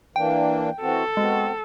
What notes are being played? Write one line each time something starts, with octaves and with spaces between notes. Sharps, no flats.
E3 A#3 D4 G5
E3 C4 F#4 A4
G#3 B3 C4 F#4